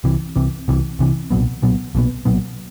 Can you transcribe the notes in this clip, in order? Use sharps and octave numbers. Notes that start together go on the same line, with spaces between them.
C2 C3 E3
C2 C3 E3
C2 C3 E3
C2 C3 E3
B1 A#2 F#3 B3
B1 A#2 F#3 B3
B1 A#2 F#3 B3
B1 A#2 F#3 B3